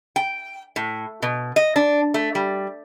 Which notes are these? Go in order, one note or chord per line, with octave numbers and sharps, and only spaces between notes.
G5
A2
B2
D#5
D4
A3
G3